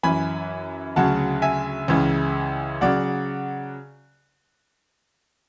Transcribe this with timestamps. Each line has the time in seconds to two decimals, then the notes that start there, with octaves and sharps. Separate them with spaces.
0.03 F#2 E3 G#5 B5
0.96 D2 C#3 F#3 F#5 A5
1.42 E5 G#5
1.88 C#2 C#3 E3
2.81 C#3 F#3 D5 F#5